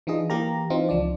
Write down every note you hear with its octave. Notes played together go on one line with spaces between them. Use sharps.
E3 D4 D#4 F4 G#4 D#5
E3 A#3 G4 A#4 A#5
E3 C4 D#4 F4
C#2 F3 D4 D5